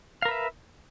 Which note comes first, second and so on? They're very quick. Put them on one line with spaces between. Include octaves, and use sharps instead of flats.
F5 A#4 B4 E5